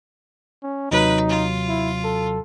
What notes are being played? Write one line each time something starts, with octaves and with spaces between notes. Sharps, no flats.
C#4
D#2 C3 F#3 D#4 B4
F4
E4
A4